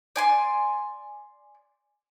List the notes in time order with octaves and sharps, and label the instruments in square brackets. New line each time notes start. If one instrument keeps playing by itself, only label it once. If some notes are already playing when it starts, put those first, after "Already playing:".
[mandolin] D5 G#5 C6